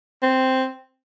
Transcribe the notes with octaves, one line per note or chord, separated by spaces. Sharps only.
C4